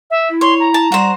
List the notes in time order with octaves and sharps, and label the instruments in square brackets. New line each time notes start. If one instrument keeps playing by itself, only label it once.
[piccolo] E5
[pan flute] E4
[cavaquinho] C#5 [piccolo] C6
[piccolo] A#5
[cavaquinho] A5
[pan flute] G3 [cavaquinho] F#4 C5